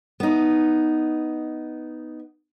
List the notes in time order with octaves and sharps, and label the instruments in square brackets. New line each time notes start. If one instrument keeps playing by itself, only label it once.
[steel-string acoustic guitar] B3 D#4